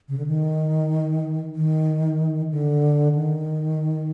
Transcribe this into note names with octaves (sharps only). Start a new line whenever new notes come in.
C#3
D3
D#3
D#3
D3
D#3